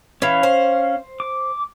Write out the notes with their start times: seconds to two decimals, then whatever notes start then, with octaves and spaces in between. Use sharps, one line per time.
0.22 E3 C#4 F5
0.43 C5
1.20 D6